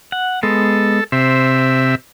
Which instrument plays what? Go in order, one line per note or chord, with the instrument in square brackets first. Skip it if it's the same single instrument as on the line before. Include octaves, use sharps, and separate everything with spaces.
[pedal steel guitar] F#5
[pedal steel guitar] G#3 B3 [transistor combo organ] A4
[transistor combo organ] C3 E5 [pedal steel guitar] C5